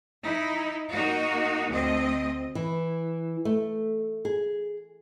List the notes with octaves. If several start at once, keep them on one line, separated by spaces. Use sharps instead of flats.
D#4 E4
A#3 D#4 F#4
D2 C4 D#5
E3
A3
G#4